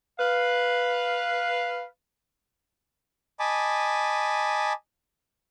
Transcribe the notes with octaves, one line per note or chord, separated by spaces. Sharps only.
B4 F5
D#5 G#5 A5 B5 D6